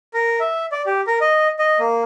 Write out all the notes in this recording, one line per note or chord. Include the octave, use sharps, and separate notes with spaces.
A#4
E5
D5
G4
A#4
D#5
D#5
A#3